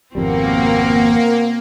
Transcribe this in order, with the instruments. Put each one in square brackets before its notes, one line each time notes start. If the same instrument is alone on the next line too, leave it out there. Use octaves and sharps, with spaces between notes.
[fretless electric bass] G#1 F2 G3 [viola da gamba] B2 C4 [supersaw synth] A#3 [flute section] A#4 F#5